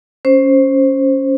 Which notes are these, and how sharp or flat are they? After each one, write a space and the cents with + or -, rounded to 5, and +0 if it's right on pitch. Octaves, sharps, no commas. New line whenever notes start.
C#4 +0 C5 +10